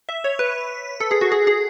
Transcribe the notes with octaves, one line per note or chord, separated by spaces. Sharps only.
E5
C#5
B4
A4
G#4
F#4
G#4
G#4